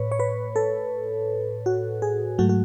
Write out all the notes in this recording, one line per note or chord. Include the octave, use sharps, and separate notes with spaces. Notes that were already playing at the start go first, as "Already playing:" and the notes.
Already playing: A2 B4 C#5
C#5
B4
A4
F#4
G#4
G#2 F#3 A3 F#4
F#4